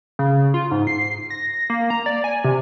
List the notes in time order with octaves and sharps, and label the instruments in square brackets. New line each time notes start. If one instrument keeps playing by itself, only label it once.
[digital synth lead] C#3
F4
G#2
C7
A#6
A#3
A#5
D5
G#5
C3